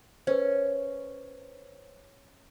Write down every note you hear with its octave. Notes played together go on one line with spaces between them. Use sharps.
C#4 B4 C5